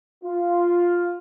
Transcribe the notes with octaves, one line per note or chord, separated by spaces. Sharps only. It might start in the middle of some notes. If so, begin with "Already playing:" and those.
F4